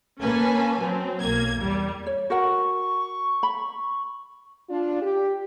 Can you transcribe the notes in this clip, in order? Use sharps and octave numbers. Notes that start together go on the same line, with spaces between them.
A#3 C#4 B4 G#5 A5
F#3 C4
B1 A#3 G#6
E2 G3
C#5
F#4 A#4 F#5 C#6
B5
D4 F4
G4